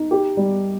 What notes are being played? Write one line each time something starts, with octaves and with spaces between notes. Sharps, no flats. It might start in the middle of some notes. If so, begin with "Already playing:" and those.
Already playing: D#4
G4
G3